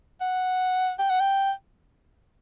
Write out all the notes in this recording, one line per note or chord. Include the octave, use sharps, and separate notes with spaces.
F#5
G5
F#5
G5